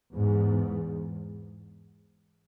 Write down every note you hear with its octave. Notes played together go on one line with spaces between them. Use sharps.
E2 G#2